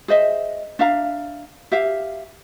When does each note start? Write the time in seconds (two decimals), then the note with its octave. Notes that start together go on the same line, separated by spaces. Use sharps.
0.08 G#4 C5 D#5 E5
0.79 D4 E5 F5 A#5
1.72 G4 E5 F5